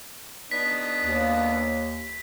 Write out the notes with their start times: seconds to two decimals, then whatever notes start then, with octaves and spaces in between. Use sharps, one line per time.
0.51 B3 D4 D#4 B6
1.03 D#2